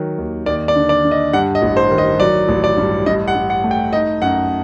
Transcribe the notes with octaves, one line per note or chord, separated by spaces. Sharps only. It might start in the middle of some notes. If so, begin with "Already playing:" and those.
Already playing: D#3 F#3
D#2
D#2 D5
D5
D3
D5
D3
D#5
G2 F#5
D#5
A1
C5
D#3
D#5
F#3 D5
A1
D5
G2
G2 D#5
F#5
G2
F#5
A3
G5
D#4 D#5
F#2 F#5